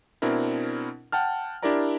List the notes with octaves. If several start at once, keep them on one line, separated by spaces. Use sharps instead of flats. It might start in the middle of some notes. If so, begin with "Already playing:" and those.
B2 C4 D4 E4 A#4
F#5 G5 A5 F6
D4 E4 G4 A#4 D5 A#5